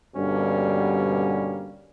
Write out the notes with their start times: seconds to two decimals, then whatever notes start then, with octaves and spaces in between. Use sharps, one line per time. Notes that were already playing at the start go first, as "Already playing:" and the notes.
0.16 G2 B2 D3 G3 A#3 C#4